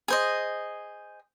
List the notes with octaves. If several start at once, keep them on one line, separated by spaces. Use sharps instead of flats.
G#4 C5 D#5